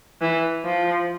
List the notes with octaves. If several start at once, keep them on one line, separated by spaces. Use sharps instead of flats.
E3
F3